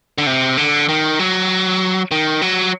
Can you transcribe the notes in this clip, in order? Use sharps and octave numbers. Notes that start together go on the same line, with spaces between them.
D3
C3
D3
D#3
F#3
D#3
F#3